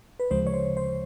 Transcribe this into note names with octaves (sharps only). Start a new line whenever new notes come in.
B4
D2 C#3 F3 G#3 C5
C#5
C5
C5